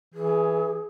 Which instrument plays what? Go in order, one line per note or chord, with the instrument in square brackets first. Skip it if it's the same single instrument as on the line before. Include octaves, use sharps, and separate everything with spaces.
[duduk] E3 [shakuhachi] G#4